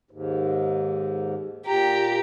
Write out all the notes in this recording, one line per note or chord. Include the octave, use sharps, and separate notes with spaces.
D#2 G#2
A#2 G4 A#5